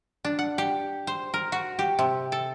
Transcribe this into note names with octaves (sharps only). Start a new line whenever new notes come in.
D4
F#5
G4
C5
A#4
F#4
G4
C3
A4